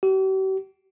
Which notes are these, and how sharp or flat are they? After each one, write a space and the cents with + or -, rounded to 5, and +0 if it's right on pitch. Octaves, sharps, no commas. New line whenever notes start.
G4 -45